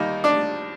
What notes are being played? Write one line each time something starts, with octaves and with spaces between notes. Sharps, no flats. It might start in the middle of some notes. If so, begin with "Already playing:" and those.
Already playing: D#2 D#3 G3 A#3 D#4
D4 D5